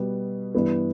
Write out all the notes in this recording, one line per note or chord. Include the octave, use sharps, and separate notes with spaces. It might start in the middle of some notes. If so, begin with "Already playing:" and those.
Already playing: B2 G3 B3
G2 E3 B3